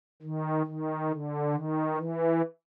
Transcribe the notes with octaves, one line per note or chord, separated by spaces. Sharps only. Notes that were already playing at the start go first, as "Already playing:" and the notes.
D#3
D#3
D3
D#3
E3